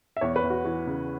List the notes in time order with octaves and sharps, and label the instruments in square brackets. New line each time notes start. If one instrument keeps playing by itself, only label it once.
[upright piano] E5
E2 C#5
B4
E2
F#4
E3 F#4
C#3